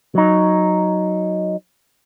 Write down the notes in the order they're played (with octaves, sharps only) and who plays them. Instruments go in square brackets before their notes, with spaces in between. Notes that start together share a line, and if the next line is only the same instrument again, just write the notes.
[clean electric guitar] F#3 D#4